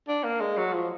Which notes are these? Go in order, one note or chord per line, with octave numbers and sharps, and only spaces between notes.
D4
A#3
G#3
F#3
F3